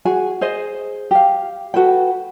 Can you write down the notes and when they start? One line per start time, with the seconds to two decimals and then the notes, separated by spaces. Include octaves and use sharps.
0.05 F#4 G#4 G#5
0.41 G#4 C5 D#5
1.11 G4 F5
1.74 F#4 A4 B4 G5